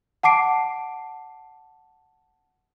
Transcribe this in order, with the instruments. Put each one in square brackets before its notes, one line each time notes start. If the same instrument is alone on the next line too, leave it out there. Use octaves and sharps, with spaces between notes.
[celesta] F#5 A5 D6 C7 D7